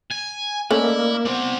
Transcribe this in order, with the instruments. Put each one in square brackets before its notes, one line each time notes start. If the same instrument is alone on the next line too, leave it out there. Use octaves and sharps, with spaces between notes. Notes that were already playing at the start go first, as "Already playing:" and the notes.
[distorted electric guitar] G#5
[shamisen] A3 C#4 [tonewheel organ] A#3 [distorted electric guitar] E4 [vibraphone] D5 D#5
[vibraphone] B3 C5 F#5 [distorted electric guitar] C4 D5